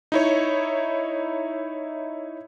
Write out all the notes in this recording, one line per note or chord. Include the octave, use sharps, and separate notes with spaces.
D#4 E4 C#5